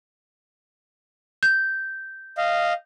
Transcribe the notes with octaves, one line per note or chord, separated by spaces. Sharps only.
G6
D#5 F5